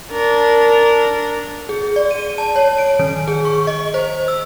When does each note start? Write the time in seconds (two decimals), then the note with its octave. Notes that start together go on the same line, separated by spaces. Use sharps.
0.12 D4 A#4
1.69 G#4
1.96 D5
2.11 D#7
2.38 A5
2.56 C#5
2.78 D7
2.99 D#3
3.28 G#4
3.45 C#6
3.67 D#5
3.94 C5
4.28 E6